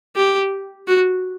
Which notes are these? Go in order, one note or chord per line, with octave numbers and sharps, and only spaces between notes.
G4
F#4